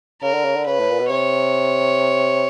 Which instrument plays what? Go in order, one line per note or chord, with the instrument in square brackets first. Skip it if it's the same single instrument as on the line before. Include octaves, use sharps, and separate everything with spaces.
[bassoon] C#3 [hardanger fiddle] A#4
[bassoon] D3
C#3
D3
[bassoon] C#3 [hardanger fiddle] B4
[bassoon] A2
A#2
B2
[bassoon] C3 [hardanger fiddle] C#5